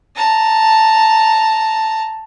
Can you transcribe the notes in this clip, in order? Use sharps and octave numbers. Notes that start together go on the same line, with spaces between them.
A5 A#5